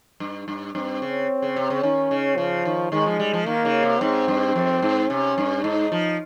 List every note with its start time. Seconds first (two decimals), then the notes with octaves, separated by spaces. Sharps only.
0.20 G2
0.48 G2
0.75 G2 C4
1.02 C#3
1.42 C#3
1.56 C3
1.70 C#3
1.83 D#3 C#4
2.11 C#3
2.38 C#3 F3
2.65 D#3
2.92 D#3 G#3
3.06 F3
3.19 G3
3.33 F3
3.46 D#3 A#3
3.65 C#3
3.83 C3
4.01 G#2 C4
4.28 G2
4.56 F2
4.82 G#2
5.10 C3 C#4
5.38 G2
5.64 G#2 D#4
5.92 F3